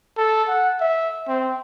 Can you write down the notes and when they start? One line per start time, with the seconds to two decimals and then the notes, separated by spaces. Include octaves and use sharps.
0.18 A4
0.48 F#5
0.81 E5
1.28 C4